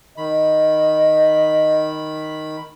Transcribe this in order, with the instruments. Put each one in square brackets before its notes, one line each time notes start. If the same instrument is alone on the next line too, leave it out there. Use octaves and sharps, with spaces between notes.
[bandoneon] D#3 B5 [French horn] D#5